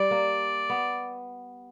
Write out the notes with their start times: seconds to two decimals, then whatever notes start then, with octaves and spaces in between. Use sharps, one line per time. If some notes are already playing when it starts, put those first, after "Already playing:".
Already playing: G3 D5
0.11 A#3
0.70 B3